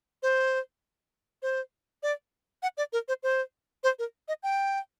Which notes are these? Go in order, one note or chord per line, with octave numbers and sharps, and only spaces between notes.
C5
C5
D5
F#5
D5
A#4
C5
C5
C5
A#4
D#5
G5